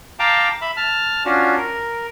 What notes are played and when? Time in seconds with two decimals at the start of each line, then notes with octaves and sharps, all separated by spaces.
0.19 F5 G5 A5 A#5 D6
0.62 E5 B5
0.77 A5 F6
1.25 C#4 D4 F4 F#4
1.57 A#4